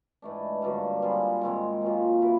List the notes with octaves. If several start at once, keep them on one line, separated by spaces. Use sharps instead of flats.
G#2 E3 A3 D4
G2 D3 F#3 A#3
G3 C4 F4 G#4
G#2 D#3 G#3 C4
A#2 F#3 A#3
C#3 F#3 B3 E4